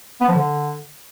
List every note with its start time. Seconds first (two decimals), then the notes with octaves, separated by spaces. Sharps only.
0.21 B3
0.28 F3
0.35 D3